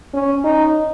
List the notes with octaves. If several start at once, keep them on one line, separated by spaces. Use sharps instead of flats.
C#4
D#4